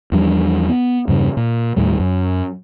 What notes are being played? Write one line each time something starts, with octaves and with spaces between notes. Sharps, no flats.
E2 F3 G3 D4
B3
E2 G2 C#3
A#2
D#2 A2 G3
F#2